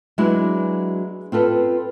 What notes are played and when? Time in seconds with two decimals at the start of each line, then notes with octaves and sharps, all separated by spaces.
0.18 F#3 G#3 B3 D4 E4 F#4
1.32 C4 F4 A4 B4